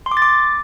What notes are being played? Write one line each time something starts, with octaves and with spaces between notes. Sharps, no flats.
C6
D6
A6
D6